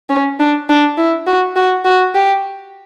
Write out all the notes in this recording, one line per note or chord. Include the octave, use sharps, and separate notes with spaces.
C#4
D4
D4
E4
F#4
F#4
F#4
G4